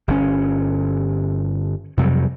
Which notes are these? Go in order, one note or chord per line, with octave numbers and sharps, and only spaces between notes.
G1 C#3 C#4
F2 C3 F#3 G3